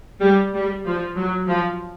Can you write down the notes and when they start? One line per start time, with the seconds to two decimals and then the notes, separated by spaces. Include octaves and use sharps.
0.22 G3
0.54 G3
0.85 F3
1.17 F#3
1.48 F3